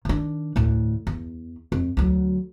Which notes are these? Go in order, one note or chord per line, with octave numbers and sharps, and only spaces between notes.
D#3 D4
D2 A2
E2
F2
D2 F#3